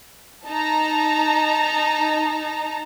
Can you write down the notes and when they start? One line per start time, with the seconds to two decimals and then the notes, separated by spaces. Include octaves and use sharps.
0.47 D#4 A5 A#5